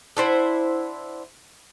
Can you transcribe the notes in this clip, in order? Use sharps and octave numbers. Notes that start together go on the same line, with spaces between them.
D4 E4 C5 F#5